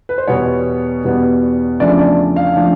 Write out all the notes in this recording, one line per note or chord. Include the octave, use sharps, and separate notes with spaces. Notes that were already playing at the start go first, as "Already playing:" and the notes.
B4
C5
E2 B2 G3 B3 C#5
E2 B2 G3 B3
E2 C#3 F3 A3 D4 D5
D5
F5
C#3 F3 A3 D4